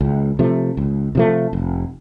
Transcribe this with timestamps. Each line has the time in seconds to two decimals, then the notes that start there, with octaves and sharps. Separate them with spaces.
0.01 C#2
0.39 C3 F3 A3
0.77 C#2
1.15 C3 F3 A3
1.53 F1